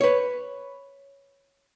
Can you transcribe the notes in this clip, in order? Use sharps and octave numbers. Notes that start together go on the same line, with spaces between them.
B4 C#5